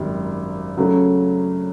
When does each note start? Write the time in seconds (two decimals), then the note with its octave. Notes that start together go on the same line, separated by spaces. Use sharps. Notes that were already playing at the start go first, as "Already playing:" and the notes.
Already playing: G#1 F#2 D#3 G3
0.77 C#3 F#3 A3 C#4